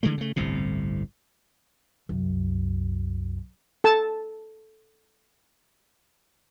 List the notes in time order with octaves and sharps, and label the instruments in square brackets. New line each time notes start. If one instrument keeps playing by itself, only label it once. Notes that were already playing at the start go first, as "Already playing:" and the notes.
[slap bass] D3 E3 G#3 A3
C#3 A3
G1 C2 A2 C3
[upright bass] C2 F#2
[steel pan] A4 A5